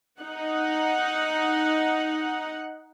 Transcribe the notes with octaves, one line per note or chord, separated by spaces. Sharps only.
D#4 F#5